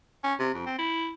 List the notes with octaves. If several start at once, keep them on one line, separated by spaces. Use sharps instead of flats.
C#4
C3
F2
C4
E4